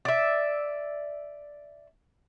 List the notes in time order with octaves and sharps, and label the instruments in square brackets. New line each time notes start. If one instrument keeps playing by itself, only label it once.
[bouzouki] D5 E5